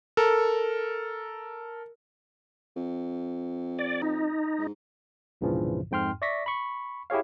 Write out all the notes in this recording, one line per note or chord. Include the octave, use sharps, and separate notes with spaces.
A4 A#4
F2
D5
D#4
G#2
C2 G2 A#2 C#3 E3 F3
F2 G#2 G5 C6 F6
D5 E5 C#6 A#6 B6
B5 C#6
E4 G4 G#4 C#5 F5